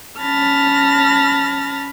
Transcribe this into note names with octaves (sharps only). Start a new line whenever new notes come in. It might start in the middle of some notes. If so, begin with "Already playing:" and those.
C#4 A5 B5 F6 A6 A#6